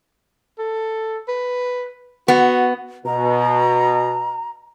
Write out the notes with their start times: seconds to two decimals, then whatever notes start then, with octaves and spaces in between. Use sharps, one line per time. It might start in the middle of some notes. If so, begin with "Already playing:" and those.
0.59 A4
1.28 B4
2.28 B3 F#4
3.06 B2 A#5